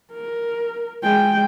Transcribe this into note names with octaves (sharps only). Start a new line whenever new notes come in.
A#4
G#3 G5